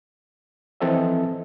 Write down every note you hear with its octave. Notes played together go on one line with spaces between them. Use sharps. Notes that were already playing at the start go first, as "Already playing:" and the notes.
E3 F3 C4 A4 D#5 E5